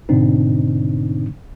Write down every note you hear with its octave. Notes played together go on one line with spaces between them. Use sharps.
G#2 B2 D3 C4 D4 D#4